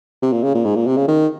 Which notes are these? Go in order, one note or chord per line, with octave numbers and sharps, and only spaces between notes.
C3
A#2
C#3
A#2
G#2
A#2
C3
C#3
D#3